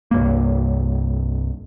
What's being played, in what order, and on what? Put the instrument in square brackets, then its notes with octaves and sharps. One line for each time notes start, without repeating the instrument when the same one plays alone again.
[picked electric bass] C2 G2 A#3